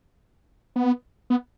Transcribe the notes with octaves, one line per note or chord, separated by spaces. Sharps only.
B3
B3